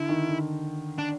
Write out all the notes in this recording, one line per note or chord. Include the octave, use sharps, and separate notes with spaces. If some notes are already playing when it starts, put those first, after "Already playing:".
Already playing: D3 E4
D#3
D3
D4